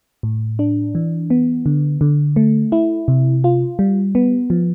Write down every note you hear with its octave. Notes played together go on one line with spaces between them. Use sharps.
A2
D4
E3
B3
D3
D3
A3
E4
C3
F4
G3
B3
F3